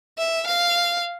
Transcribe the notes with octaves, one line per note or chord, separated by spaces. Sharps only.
E5
F5